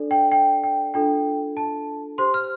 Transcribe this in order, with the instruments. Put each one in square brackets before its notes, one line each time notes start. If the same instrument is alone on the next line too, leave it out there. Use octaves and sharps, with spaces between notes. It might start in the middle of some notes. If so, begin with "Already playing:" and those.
Already playing: [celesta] D4 A4 D5
G5
G5
G5
D4 F4 A4 G5
A5
G4 C5 C6
F6